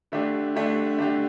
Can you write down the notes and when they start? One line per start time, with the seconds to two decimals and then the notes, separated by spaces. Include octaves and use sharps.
0.12 D3 A3 D4 G4
0.55 D3 A3 D4 G4
0.98 D3 A3 D4 G4